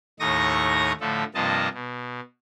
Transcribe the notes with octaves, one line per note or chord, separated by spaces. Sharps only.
D#2 A2 D#4 C#6 D#6 A#6
A2 D3 F3 A3 A4
G2 C3 F3 A#3 D#5 A5
B2